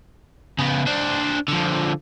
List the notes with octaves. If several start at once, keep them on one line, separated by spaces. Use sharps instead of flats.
C#3 B3
D4 C5
D3 F3